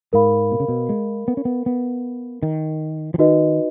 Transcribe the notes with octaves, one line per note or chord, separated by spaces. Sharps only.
G#2 A#4 F5 B5
B2
C#3
B2
G#3
B3
C#4
B3
B3
D#3
F3
D#3 D#4 F#4 B4 D#5